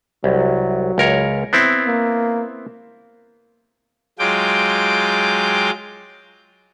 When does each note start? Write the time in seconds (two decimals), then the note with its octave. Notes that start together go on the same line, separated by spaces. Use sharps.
0.24 C2 F#3
0.98 C#2 A#4 C#5
1.53 B3 C4 E4
1.86 A#3
4.19 F#3 G#3 F4 G5 D6